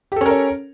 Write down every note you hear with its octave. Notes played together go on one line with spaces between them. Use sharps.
C#4 G4 A4 A#4 C#5